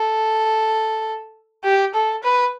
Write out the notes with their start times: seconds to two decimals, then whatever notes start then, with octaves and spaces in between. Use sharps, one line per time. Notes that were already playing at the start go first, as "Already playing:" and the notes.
Already playing: A4
1.64 G4
1.94 A4
2.23 B4